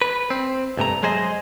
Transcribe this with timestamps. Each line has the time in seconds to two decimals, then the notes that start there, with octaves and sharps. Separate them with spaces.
0.02 B4
0.30 C4
0.77 C2 G2 A3 A#5
1.03 F#3 G#3 G#4 C5 D#5